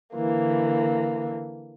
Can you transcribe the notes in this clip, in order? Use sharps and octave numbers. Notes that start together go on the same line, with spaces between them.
D3 E3 A#3